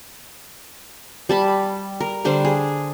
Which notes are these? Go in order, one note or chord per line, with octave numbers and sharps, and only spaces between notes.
G3 A5 B5
A#4
D3 G3 D4 C5
G#4